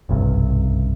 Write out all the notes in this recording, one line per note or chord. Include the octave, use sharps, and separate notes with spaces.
F#1 B1 G2 C3